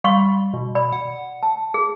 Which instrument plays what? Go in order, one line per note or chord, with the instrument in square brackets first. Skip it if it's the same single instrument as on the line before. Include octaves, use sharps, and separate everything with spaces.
[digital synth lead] G3 [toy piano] F5 C6 C#6
[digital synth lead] B2
[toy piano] D5 B5
[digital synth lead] F#5
[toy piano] A5
G#4